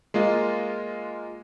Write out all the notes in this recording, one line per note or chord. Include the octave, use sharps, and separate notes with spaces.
G#3 A#3 F4 D#5